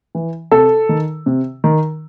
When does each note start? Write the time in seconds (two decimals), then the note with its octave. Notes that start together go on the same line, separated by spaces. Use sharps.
0.15 E3
0.51 C3 A4
0.89 D#3
1.26 C3
1.64 D#3